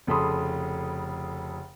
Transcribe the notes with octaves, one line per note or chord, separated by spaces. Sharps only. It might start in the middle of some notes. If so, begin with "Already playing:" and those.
F1 C#3 A4 B5 C6 D#6